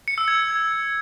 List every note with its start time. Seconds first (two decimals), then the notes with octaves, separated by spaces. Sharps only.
0.08 C#7
0.18 E6
0.28 G#6